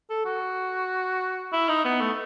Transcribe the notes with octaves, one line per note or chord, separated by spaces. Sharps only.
A4
F#4
E4
D#4
B3
A3